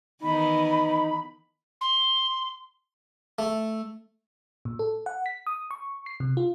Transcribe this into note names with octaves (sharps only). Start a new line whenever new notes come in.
D#3 E3 B3 D#4 B5
C6
A3
A#2
A4
F#5
B6
D#6
C#6
C7
C3
F4